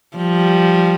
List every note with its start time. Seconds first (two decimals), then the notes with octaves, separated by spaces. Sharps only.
0.17 F3 G3